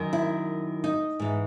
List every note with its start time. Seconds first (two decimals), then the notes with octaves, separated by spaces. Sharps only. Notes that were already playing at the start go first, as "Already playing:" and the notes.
Already playing: F#2 D#3
0.13 E4
0.84 D#4
1.20 G#2 E3